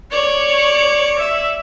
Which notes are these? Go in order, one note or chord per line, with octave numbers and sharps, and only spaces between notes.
C#5 D5
E5